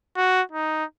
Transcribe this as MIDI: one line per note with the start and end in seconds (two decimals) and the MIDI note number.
0.17 0.42 66
0.52 0.85 63